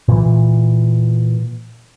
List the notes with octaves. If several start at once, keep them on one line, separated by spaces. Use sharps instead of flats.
A#2 E3